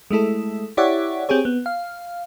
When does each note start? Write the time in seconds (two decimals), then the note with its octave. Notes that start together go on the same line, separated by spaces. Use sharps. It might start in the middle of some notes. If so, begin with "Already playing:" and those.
0.11 G#3 A3 E4 A4
0.77 E4 G4 C#5 D5 E5 F#5
1.29 C4 G4 G#4 C#5
1.45 B3
1.66 F5